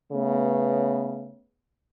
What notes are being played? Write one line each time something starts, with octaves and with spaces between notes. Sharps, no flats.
C#3 A3 B3